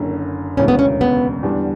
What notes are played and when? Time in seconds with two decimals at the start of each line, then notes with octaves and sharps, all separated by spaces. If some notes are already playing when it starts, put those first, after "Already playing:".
Already playing: F#1 F#2 D3
0.57 E1 D2 C#3 E3 C#4
0.68 B3
0.79 C#4
1.01 B3
1.43 E2 D3 G3 D4